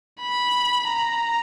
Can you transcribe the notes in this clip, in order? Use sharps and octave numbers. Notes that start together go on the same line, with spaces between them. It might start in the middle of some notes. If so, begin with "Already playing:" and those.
B5
A#5